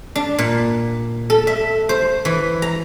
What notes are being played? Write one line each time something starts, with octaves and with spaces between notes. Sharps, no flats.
D4
A#2
A4
E5
C5
E3
A#5